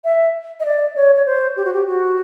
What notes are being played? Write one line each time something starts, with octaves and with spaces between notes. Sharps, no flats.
E5
D#5
D5
C#5
C#5
C5
G4
F#4
G4
F#4